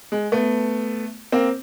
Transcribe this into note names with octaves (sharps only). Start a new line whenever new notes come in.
G#3
A3 B3
A#3 C4